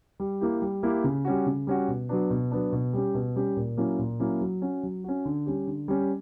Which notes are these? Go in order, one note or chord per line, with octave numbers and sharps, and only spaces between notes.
G3
A#3 E4 G4
G3
A#3 E4 G4
C#3
G3 C#4 F#4
C#3
G3 C#4 F#4
B2
F#3 B3 D4
B2
F#3 B3 D4
B2
G3 C#4 G4
B2
G3 C#4 G4
A#2
F#3 A#3 C#4 E4
A#2
F#3 A#3 C#4 E4
F#3
C#4 F#4
F#3
C#4 F#4
D3
G3 C#4 G4
D3
G3 C#4 G4